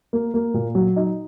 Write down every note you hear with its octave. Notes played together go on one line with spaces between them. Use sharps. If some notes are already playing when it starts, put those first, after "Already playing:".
A#3
A#3
A#2
F#3
D#4